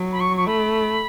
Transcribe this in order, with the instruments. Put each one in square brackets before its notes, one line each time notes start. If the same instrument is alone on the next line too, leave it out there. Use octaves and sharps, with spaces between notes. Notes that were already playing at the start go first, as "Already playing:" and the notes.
Already playing: [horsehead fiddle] F#3
[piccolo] B5
C#6
C#6
[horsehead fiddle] A3 [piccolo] B5